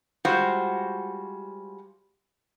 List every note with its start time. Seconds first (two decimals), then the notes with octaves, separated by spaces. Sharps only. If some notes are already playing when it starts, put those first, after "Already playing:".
0.25 G3 G#3 F4 F#4 C5